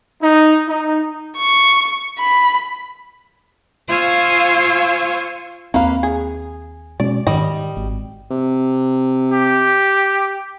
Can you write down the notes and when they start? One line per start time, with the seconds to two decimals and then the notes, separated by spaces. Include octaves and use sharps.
0.22 D#4
0.69 D#4
1.37 C#6
2.18 B5
3.88 F4 C5 F5 G#5 C#6 E6
5.74 D#2 A#3 C4 B4 F5
6.03 G#4
7.00 B2 G#3 C#4 D5
7.27 G#2 D#3 G3 D#5
7.77 G#1
8.31 C3
9.32 G4